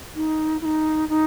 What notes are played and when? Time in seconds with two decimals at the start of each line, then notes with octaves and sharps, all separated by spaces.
0.15 D#4
0.61 E4
0.64 D#4
1.09 D#4